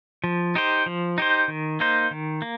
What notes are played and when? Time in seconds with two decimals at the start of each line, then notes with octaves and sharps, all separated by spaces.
0.24 F3
0.55 D#4 G4 C5
0.86 F3
1.18 D#4 G4 C5
1.48 D#3
1.80 A#3 D#4 C5
2.11 D#3
2.42 A#3